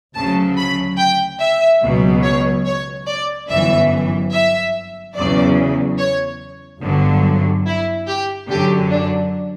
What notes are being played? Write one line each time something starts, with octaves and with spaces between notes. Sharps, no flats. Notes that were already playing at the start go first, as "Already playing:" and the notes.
D2 C#3 F#3 A5
B5
G5
E5
C#2 B2 F#3
C#5
C#5
D5
G1 F#2 E3 E5
E5
E2 C#3 F#3 D5
C#5
G1 G2 D3 F#3
E4
G4
F#2 D3 F#3 G4
D4